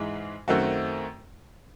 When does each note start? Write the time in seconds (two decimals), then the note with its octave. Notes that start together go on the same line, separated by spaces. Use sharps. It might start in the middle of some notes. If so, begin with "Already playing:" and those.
Already playing: G#2 E3 G#3 D#4 G#4
0.48 F#2 D#3 A3 C4 F#4